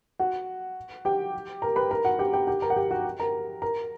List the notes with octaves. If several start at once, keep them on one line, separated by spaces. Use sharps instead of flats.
F#4 F#5
G4 G5
A#4 A#5
B4 B5
A#4 A#5
F#4 F#5
G4 G5
G4 G5
G4 G5
A#4 A#5
F#5
G4 G5
F#4 F#5
A#4 A#5
A#4 A#5